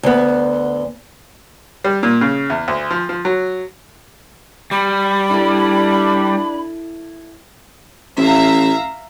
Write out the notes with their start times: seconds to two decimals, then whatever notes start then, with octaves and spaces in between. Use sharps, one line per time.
0.03 D2 B3
1.84 G3
2.03 A#2
2.21 C#3
2.50 E2
2.68 D2
2.90 F3
3.09 F3
3.25 F#3
4.71 G3 B5
5.31 D4 E4 A4
8.17 A1 E5 F5 A#5